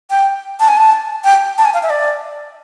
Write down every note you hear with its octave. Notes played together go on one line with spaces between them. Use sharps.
G5
A5
G#5
A5
G5
A5
G#5
F5
E5
D5